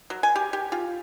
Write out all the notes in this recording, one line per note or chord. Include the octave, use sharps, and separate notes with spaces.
F#3
G#5
G4
G4
F4